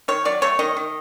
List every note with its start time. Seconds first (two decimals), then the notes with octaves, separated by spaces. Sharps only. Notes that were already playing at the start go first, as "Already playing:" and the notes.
0.08 D#3 C#5
0.25 F#3 D5
0.42 A3 C#5
0.59 D#3 D#5
0.77 D#3